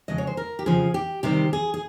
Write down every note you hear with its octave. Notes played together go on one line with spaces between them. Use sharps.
F2 C#3 G#3 D#5
C#5
C5
A#4
G4
F2 C#3 F3 C4 G#4
G4
C3 D#3 G3 C4 G4
G#4
G#4